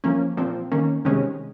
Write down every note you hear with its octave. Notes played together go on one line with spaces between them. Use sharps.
F3 A#3 C#4
A#2 F3 C4
D#3 A#3 C#4
C3 D#3 G#3 C#4